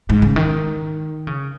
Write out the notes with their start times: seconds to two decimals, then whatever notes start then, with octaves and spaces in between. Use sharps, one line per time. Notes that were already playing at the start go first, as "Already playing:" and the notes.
0.09 G#2
0.22 C#3
0.36 D#3
1.27 C#3